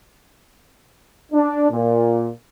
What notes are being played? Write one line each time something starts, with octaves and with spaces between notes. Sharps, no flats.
D4
A#2